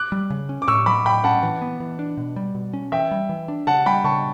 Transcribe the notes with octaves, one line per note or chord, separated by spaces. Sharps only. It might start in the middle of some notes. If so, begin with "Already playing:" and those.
Already playing: D6 F#6
G3
C#3
C#4
D6
A2 C#6 E6
F#3 B5 D6
A2 G5 B5
C#4 F#5 A5
E3
B3
E3
D4
B2
G3
B2
C#4
E3 E5 G5
G3
E3
D4
C#3 F#5 A5
G3 G5 B5
C#3 A5 C#6